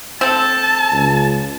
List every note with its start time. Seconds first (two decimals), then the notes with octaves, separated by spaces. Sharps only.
0.21 C4 A4 A5
0.92 C#2